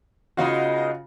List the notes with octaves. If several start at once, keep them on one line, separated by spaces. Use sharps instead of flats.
C#3 G#3 B3 D#4 F4 F#4